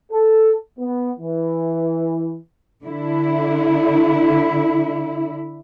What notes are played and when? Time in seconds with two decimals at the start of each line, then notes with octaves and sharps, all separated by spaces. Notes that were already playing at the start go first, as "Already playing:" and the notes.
0.11 A4
0.79 B3
1.20 E3
2.85 D3 E4